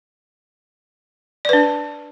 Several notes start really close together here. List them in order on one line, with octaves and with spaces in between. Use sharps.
D5 B4 D4